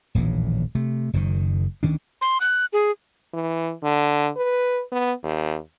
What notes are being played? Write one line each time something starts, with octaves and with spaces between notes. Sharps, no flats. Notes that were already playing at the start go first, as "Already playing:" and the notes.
D#1 A#1 A2 E3
C3 A3
F#1 F#2 D3 D#3
D2 D#3 C#4 D4
C6
F#6
G#4
E3
D3
B4
B3
D#2